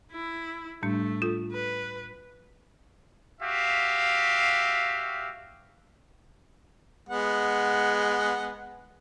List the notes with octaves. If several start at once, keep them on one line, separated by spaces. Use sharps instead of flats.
E4
A2 G3 A3 D4
F4 A4
B4
F#4 G4 E5 F5
G#3 B3 F#5